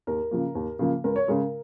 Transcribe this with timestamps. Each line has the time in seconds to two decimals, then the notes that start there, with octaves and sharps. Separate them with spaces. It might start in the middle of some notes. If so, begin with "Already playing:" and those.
0.07 D#2 A#4
0.31 C#3 F3 A#3
0.55 D#2
0.79 C#3 F3 A#3
1.04 C#2 A#4
1.16 C#5
1.28 C#3 G#3 A#4